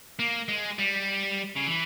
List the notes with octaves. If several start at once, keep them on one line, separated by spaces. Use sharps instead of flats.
A#3
G#3
G3
C#3
E3